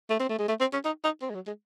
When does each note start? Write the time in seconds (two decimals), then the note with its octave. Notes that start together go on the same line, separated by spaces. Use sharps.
0.10 A3
0.20 C4
0.29 A3
0.39 G#3
0.48 A3
0.60 C4
0.73 C#4
0.85 D#4
1.04 D#4
1.22 C4
1.30 G#3
1.35 F#3
1.47 G#3